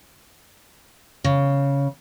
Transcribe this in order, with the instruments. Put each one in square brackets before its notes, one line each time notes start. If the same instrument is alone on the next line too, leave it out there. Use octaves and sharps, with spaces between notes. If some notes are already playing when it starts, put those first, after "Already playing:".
[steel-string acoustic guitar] C#3